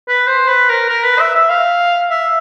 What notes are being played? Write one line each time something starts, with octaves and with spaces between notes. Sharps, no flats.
B4
C5
B4
A#4
A#4
B4
E5
E5
F5
E5